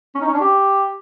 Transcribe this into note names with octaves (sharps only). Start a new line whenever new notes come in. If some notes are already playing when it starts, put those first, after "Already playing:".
C#4
D#4
C#4
D4
G4